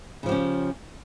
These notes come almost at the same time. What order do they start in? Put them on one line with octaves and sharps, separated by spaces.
C#3 F3 G4 C#4